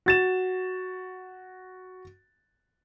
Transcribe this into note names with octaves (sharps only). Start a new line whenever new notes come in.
F#4 A6 E7